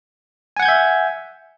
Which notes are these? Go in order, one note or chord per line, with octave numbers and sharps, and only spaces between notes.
E5 F#5 G#5 G6 G#6